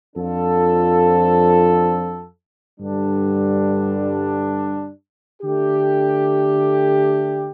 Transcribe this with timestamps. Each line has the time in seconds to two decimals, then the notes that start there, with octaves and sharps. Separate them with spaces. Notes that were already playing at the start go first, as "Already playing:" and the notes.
0.15 F2 F3 D4 F4 A4
2.78 G2 D3 G3 D4
5.42 D3 A3 D4 G4